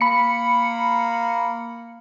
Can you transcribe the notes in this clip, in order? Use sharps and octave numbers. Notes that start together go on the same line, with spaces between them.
A#3 B5 C#7